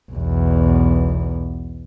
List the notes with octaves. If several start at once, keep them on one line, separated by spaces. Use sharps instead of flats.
B1 E2